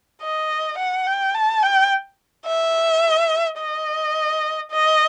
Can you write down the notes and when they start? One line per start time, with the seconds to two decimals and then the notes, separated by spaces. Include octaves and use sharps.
0.22 D#5
0.78 F#5
1.07 G5
1.34 A5
1.63 G5
2.46 E5
3.59 D#5
4.71 D#5